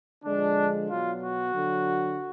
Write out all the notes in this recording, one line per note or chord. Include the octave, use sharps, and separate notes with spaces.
D3 F3 G#3 D4
B2 F#3 F4
F#4
D3 F#3